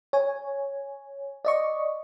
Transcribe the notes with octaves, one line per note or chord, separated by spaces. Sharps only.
C#5 G#5
D5 D#5 C#6